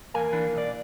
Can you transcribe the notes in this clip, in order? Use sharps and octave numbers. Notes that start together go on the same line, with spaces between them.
E2 C#3 A#3 G#5
E3 D4
B1 D5